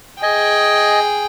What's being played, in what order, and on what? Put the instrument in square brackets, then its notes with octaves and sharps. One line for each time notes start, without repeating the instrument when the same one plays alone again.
[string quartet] G#4 G5 [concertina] D#5 G#5